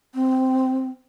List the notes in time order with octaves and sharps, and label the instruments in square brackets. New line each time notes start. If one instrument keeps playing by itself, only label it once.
[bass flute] C4